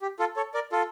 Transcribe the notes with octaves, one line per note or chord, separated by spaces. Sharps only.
G4
F4 A4
A4 C#5
A#4 D5
F4 A4